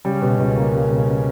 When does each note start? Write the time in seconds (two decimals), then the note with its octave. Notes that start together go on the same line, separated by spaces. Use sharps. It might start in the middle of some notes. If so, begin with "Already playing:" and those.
0.05 C#3 G3
0.22 B2
0.39 C#2
0.56 A#3
0.73 G3
0.90 B2